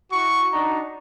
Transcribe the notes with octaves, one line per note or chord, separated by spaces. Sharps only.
E4 F#4 C#6
D4 D#4 F#4 A#5